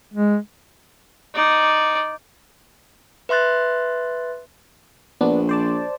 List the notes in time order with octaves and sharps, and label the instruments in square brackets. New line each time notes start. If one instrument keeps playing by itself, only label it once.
[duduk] G#3
[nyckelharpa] D#4 D5
[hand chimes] B4 E5 C6 F#6 A6
[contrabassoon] A#1 [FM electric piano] B3 D4
[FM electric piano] C5 D5 A5